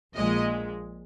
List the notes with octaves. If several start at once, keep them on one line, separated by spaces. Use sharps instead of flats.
A#1 A#2 G#3 D#5